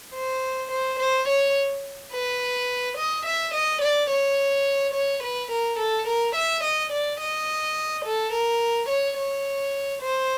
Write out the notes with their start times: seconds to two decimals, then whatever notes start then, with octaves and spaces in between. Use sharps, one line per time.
0.15 C5
0.71 C5
1.00 C5
1.28 C#5
2.12 B4
2.98 D#5
3.26 E5
3.54 D#5
3.82 D5
4.10 C#5
4.94 C#5
5.23 B4
5.52 A#4
5.79 A4
6.08 A#4
6.35 E5
6.64 D#5
6.92 D5
7.20 D#5
8.05 A4
8.33 A#4
8.89 C#5
9.18 C#5
10.02 C5